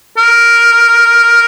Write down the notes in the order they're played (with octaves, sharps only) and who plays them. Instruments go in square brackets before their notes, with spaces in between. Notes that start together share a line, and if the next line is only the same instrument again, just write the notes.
[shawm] A#4